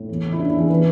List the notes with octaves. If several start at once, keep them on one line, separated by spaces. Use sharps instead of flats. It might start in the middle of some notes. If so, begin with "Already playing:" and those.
Already playing: A2
E2
C#3
E4
E3 D4
E4
E2
G#4
E3 B4